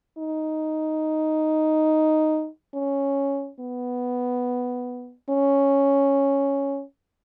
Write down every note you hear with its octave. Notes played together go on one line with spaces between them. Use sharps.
D#4
C#4
B3
C#4